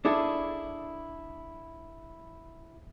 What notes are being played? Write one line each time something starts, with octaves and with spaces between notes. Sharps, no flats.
D4 E4 G#4 A4